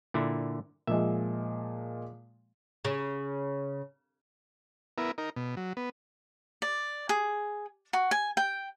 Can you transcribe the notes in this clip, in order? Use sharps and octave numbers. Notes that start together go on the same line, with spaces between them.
A#2 D3 E4
A#2 F3 G#3 E5
C#3
B3 E4 A#4
D#4 A#4
B2
F#3
B3
D5
G#4
F#4
G#5
G5